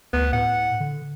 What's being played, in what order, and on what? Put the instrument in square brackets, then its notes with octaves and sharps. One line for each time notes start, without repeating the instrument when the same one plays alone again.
[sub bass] D2 [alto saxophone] B3
[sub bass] A2 [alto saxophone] F#5
[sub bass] D3